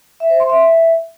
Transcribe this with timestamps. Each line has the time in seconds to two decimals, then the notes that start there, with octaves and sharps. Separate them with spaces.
0.20 E5
0.30 C5
0.40 C6
0.50 E5